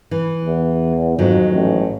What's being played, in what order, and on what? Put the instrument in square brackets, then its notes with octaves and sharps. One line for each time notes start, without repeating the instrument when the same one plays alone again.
[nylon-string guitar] E3
[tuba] E2
[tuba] F2 [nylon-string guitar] G#2 D#3 F#3
[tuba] A1